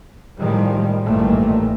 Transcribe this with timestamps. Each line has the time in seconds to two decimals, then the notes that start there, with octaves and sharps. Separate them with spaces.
0.39 A2 D#3 F3 G3 G#3
1.05 A1 G2 A#2 D#3 A3